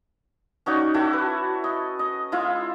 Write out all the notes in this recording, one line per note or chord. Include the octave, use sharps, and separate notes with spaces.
C#4 D#4 F#4 D5
E4 F#4 A4
B4
D#5
D#5
G#3 E4 F4